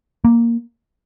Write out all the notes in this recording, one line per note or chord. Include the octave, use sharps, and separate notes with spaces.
A#3